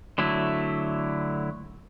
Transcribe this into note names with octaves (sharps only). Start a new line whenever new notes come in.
D3 F#3 A3 E4